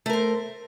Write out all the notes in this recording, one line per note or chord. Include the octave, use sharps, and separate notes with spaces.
A3 A#4 C5